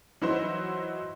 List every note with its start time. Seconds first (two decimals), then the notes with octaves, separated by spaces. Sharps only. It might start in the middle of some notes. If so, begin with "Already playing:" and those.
0.22 E3 F#3 D#4 E4 F#4 C5